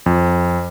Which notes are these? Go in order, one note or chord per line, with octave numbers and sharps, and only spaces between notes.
F2